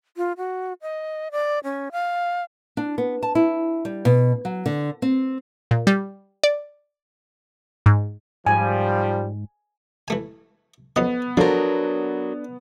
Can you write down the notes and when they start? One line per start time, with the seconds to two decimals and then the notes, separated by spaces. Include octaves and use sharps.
0.17 F4
0.37 F#4
0.82 D#5
1.32 D5
1.64 C#4
1.92 F5
2.77 D4
2.98 B3
3.23 A5
3.35 E4
3.85 G3
4.05 B2
4.45 F#3
4.66 D3
5.02 C4
5.71 A#2
5.87 G3
6.43 D5
7.86 G#2
8.47 G#2 F3 G3 G#5
10.08 E3 A3 G#5
10.96 F2 B3 C#4 D#5
11.37 F3 F#3 D4 A4 A#4 C5